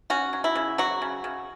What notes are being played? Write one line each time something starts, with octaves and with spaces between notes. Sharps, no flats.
C#4 F#4
F#3
E4
C#3
F#3 F#4
C#3
C#3